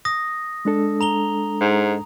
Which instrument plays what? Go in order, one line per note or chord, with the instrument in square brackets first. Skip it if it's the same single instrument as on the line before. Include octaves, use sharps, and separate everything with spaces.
[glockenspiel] D#6 A#6
[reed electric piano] G#3 D4 A4
[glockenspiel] A#5 F7 G7
[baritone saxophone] G#2